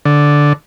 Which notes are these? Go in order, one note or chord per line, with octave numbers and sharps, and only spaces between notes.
D3